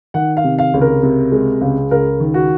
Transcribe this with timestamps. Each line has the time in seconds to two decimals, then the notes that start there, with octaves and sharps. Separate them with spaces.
0.14 D#3 F#5
0.37 F5
0.44 C3
0.58 F5
0.74 C#2
0.81 A#4
1.03 C3
1.32 G#3
1.61 C#2
1.91 C#2 A#4
2.20 D#3
2.34 F#4